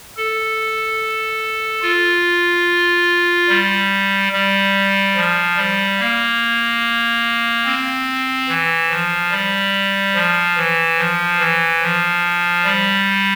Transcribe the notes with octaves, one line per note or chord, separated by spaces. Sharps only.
A4
F4
G3
G3
F3
G3
A#3
C4
E3
F3
G3
F3
E3
F3
E3
F3
G3